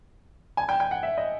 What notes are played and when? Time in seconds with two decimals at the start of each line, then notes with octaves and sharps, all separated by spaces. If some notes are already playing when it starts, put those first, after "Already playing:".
0.57 G#5
0.69 G5
0.80 G5
0.91 F#5
1.03 E5
1.17 D#5